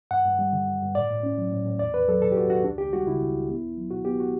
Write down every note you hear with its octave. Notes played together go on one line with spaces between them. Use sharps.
G2 F#5
G2
G3
D3
G2
G2
A2 D5
A2
C#4
F#3
A2
A2
E2 D5
E2 B4
F#3 A4
B2 A4
G4
E2 F#4
E2 F#4
C#2 D4
C#2 G4
G3 F#4
C#3 E4
C#2
C#2
B3
C#2
F#3
B2 F#4
B3 G4
F#4